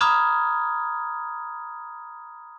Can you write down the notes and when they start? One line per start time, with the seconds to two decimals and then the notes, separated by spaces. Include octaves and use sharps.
0.01 A#5 B5 D6 D#6 F6 G#6